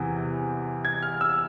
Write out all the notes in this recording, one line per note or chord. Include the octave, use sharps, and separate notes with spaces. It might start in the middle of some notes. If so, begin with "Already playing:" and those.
Already playing: E2 C3 E3
G#6
F6
E6